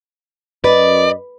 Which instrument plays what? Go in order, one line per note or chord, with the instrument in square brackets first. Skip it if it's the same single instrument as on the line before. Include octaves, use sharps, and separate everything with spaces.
[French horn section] F#2 D#5 [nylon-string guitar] B4 [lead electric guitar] D5